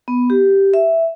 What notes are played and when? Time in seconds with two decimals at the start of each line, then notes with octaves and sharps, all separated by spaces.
0.08 B3
0.30 G4
0.74 E5